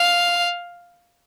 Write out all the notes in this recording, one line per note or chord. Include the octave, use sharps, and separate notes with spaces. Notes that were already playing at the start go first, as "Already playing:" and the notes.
Already playing: F5